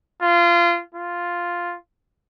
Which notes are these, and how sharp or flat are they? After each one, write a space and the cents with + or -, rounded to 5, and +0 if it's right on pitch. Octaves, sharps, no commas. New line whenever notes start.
F4 -25
F4 +0